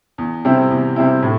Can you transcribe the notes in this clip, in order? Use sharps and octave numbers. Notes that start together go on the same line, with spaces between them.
E2
C3 G3 C4 E4
E2
C3 G3 C4 E4
A2